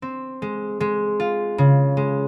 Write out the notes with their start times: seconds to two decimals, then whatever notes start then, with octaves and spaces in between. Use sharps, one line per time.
0.02 C4
0.42 G#3
0.80 G#3
1.20 F4
1.58 C#3
1.97 G#3